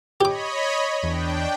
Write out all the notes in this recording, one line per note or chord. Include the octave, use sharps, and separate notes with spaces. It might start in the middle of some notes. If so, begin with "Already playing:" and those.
G4 C#5 D#5 B5 D6
E2 D4 G5